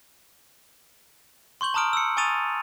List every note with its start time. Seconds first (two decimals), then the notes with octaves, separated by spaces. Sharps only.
1.61 C6 C#6 G6 F#7
1.74 A5 A#5 D#6 F6 D7
1.93 E6 C#7
2.17 G#5 C#6 D#6 A6 D#7 F7